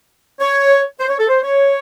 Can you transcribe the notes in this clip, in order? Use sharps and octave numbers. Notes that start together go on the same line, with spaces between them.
C#5
C5
C#5
A4
C5
C#5